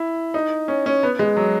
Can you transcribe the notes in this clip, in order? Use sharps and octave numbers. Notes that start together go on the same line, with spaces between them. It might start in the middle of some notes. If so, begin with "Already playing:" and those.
Already playing: E4
D#4
C#4
C#4
B3
G#3
F#3